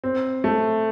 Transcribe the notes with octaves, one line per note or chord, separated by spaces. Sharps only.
C4
A3